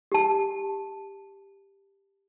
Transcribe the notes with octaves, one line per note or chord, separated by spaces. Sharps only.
G4 A5